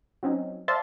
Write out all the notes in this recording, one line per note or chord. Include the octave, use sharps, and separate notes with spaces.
F#3 C4 C#4 D#4
C5 D5 E5 F5 A5 C6